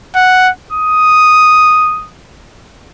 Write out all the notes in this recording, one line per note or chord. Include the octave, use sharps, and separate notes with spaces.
F#5
D#6